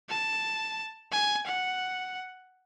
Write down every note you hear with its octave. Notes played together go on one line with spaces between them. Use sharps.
A5
G#5
F#5